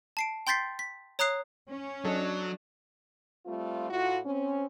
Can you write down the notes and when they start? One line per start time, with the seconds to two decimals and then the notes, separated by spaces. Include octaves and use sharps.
0.17 A5 C7 D7
0.47 G5 C6 G6 A6 B6 C7
0.79 B6
1.19 C#5 A#5 D#6 F#6 C7
1.68 C#4
2.05 F#3 D4 D#4 A4
3.46 G3 A3 C4 F4
3.90 A2 F4 F#4
4.25 C4 C#4